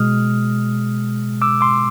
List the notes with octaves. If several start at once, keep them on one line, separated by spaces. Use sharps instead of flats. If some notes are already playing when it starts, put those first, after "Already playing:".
Already playing: B2 G#3 D#6 F6
D6 E6
C6 D6